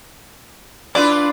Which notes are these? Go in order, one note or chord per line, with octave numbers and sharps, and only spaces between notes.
D4 E4 F4 B4 D5